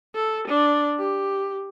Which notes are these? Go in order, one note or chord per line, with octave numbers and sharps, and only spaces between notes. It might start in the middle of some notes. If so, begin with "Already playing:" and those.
A4
D4
G4